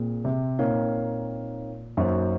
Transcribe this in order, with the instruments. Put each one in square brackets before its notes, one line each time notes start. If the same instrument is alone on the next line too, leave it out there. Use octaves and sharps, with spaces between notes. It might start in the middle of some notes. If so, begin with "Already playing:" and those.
Already playing: [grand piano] A#2 [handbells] C4 G#4
[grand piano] C3
[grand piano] A#2 [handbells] C4 D#4 A#4 C#5 F5
[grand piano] F#2 [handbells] A#3 D#4 F#4 C5